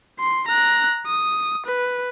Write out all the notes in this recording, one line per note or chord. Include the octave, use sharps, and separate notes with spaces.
C6
A#5 F#6
D#6
B4